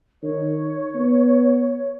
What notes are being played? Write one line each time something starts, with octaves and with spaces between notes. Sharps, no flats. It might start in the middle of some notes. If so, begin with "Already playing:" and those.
D#3 C#5
B3